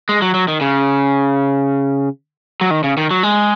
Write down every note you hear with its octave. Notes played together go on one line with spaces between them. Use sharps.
G#3
F#3
F#3
D#3
C#3
F#3
D#3
C#3
D#3
F#3
G#3